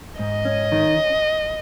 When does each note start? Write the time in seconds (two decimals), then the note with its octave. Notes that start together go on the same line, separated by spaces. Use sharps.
0.19 G#2 D#5
0.45 C#4
0.72 D#3